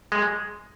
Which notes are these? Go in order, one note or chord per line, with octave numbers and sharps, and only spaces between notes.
G#3